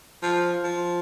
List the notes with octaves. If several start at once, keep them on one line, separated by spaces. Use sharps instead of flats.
F3
F3